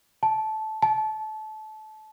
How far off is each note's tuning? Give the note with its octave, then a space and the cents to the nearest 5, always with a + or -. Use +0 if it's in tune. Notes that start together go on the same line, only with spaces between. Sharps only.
A5 -15
A5 -25